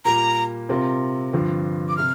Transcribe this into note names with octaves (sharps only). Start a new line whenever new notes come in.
A#2 G3 A#3 A#5
C3 G3 C4 F4 A#4
G2 D3 F3 C4
D6
C3 F6